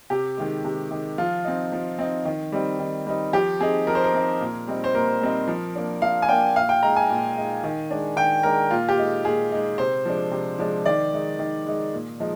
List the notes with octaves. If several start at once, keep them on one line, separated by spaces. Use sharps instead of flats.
C3 G4
D#3 G#3
C3
D#3 G#3
F3 F4
C4 D#4
F3
C4 D#4
D#3
G3 C4 D#4
D#3
G3 C4 D#4
F3 G4
C4 D#4 G#4
F3 A#4
C5
A#4
C4 D#4
A#2
G3 C4 D#4
C5
A#2 A#4
G3 C4 D#4
F3
A#3 D4
F3 F5
G#5
A#3 D4 G5
A#2 F5
G5
G#3 D#4 A#5
G#5
A#2
G#3 D#4
D#3
G#3 D4
D#3 G5
G#3 D4 A#4
A#2 F4
G4
G#3 D#4
A#2 G#4
G#3 D#4
C3 C5
F3 G#3 D4
C3
F3 G#3 D4
D#3 D5
G#3 D#4
D#3
G#3 D#4
A#2
F3 G#3 D#4